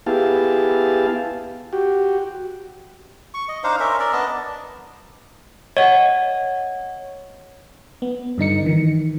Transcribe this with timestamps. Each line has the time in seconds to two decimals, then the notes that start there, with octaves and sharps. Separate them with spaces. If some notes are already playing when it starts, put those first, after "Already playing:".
0.07 B3 E4 G4 G#4 F5 A5
1.73 F#4 G4
3.34 C#6
3.48 D#5
3.64 D4 D#4 C5 F5
3.80 C#4 A#4 E5
4.00 A#4 D5
4.13 B3 D4 D#5 A5
5.77 C#5 D#5 F#5
8.02 B3
8.38 G2 D3 D#4 C#7
8.66 D#3 E3